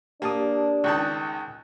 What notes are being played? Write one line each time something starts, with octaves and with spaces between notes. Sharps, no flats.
A#3 D4 G4 A5 D#6
C#2 D#3 A5 C#6 F#6 G6